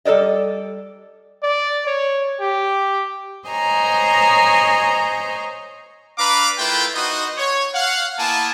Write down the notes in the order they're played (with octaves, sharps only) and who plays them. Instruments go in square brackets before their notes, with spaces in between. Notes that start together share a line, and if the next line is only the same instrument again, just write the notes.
[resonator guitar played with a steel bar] G3 A4 B4 D5 D#5
[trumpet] D5
C#5
G4
[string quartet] C5 C#5 D#5 G#5 A#5
[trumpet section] D4 B4 F5 A#5 B5 D6
A3 E4 F4 A#4 B4 G5
D#4 F#4 B4 C5 D#5
C#5
F5 F#5
A#3 B3 E4 G#5 A5